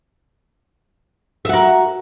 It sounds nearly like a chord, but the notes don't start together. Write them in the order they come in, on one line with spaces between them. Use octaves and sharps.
E5 F#4 A#4